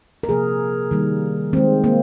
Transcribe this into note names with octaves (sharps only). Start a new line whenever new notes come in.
A#4
C3 F3 A#3 G#4
D#3 G3 A#3
D#3 G#3 C4
A#3